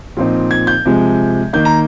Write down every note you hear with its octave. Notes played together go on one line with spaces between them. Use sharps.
A#2 F3 C4 D#4
G#6
G6
C3 F3 G#3
D#3 A#3 D#4 G6
A#5